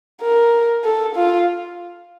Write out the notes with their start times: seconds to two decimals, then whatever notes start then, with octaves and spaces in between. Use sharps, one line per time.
0.22 A#4
0.84 A4
1.16 F4